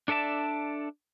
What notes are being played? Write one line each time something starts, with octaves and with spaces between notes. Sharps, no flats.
D4 A4 D5 E5 A5